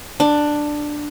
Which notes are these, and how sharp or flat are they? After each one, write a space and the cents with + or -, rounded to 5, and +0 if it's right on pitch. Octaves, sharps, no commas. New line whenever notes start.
D4 +10